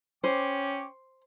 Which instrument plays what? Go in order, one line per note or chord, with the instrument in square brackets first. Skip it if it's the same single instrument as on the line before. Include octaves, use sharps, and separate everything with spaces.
[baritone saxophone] C#4 [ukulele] C5 [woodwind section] G5 C#6 D6